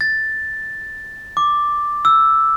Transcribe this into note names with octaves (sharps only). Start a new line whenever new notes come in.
A6
D6
E6